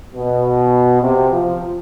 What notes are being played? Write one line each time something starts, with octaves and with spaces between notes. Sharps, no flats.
B2
C3
F3